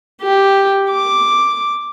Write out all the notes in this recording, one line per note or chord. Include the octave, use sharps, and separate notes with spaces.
G4
D6